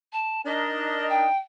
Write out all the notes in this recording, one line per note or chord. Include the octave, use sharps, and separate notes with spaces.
A5
D4 D#4 A#4 D#5
G5